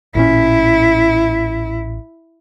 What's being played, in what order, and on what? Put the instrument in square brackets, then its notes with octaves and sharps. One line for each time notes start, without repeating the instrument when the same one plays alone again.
[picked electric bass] A1 A#2 C#4 [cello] E4